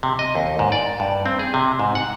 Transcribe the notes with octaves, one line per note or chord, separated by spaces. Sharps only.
C3
D#5
D#2
G#2
D5
G2
C4
G#4
C3
G#2
F#5